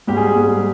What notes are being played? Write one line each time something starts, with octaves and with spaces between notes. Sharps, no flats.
G#2 G3 G4
G#4
G#4
G#2 G3